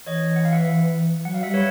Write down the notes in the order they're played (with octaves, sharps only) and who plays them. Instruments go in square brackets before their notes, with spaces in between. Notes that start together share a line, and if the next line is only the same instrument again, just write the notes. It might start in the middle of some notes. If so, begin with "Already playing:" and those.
[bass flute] E3 [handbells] C#5 D#5
[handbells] F#5
F5
E5 F#5
[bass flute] F#3 [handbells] F#5
[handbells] F5
[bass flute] G3 [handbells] E5 F#5
[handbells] B4 C#5